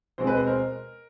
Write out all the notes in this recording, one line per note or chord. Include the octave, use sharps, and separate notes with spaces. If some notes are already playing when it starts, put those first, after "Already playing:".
B2 G#3 C4 C5
B4
C5
A#4